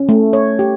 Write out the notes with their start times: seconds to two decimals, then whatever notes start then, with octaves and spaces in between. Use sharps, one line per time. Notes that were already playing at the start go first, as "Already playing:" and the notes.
Already playing: C#4
0.09 A3
0.33 C#5
0.59 G4